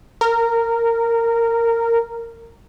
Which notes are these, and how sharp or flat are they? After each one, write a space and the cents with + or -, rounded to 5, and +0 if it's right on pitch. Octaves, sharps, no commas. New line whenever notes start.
A#4 -15